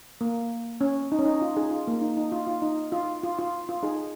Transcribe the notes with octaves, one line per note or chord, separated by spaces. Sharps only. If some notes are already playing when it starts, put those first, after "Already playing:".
A#3
C#4
D#4
C#4
D#4
F4
D#4 G#4
F4
A#3
D#4
D#4
F4
F4
D#4
F4
F4
F4
F4
D#4 G#4